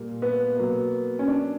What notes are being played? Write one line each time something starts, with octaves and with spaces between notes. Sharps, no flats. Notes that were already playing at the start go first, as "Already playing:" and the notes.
Already playing: A#2 G3 A#3
B3
B2 F#3 A#3
C#4
D4